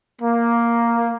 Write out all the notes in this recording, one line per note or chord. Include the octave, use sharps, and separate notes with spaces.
A#3